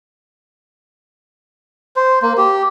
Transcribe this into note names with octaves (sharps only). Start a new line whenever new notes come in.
C5
A#3
G4